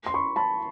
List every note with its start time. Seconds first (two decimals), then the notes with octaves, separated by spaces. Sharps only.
0.06 C6
0.14 B5 C#6
0.36 A5 B5